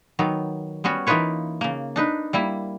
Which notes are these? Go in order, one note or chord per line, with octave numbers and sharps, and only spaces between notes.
D#3 F#3 B3
G3 B3 C#4 F#4
E3 A#3 D#4 F4 B4 C#5
C#3 A#3
D4 D#4 B4
G3 A#3 E4